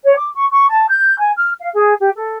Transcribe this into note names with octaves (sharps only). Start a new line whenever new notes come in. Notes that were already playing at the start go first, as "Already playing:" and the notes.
C#5
D6
C#6
C#6
A5
G6
G#5
F6
F5
G#4
G4
A4